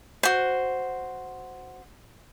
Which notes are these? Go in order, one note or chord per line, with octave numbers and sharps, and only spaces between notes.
F#4 C5